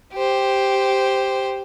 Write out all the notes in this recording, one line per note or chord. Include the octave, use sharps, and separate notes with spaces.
G4 C5